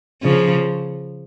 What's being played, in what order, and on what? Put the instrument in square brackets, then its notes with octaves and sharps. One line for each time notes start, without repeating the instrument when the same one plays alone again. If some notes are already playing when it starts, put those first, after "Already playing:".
[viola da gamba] C#3 F3